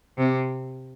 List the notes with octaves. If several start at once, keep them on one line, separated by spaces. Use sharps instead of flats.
C3